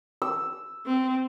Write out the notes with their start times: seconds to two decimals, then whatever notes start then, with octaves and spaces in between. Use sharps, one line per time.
0.22 E6
0.86 C4